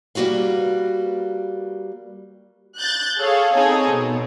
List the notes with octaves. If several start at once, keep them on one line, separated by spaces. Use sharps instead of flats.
G3 A#3 F#4 B4 F5
F#6 G6 A6
G#4 A4 C#5 F5
C4 D#4 G#4 A4 C#5
B2